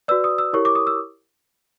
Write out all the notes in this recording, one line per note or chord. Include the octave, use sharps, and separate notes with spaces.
F#4 B4 D5 E6
D#6
E6
E4 G4 A#4 C#5 C#6
D6
D#6
E6